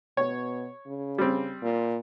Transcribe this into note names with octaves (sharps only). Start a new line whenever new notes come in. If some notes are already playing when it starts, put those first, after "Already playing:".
B2 C#5
C#3
G3 C4
A#2